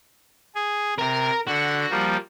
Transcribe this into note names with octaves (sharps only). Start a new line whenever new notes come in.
G#4
C3 A#4 A#5
D3 F#4
F3 G3 A#3